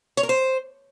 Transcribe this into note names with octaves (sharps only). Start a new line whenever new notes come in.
C#5
A#4
C5